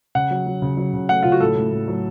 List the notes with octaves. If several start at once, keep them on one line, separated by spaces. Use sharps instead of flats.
C#3 F#5
F#3
F#3
C#3
F#3
C#3
A3 F#5
C#3 F4
F#4
A2 A4
A2
A2
F#3